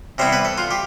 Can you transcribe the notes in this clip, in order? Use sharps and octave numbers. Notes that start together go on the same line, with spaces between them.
C3 G3 B3 E4 C5
B4
A4
F4
G4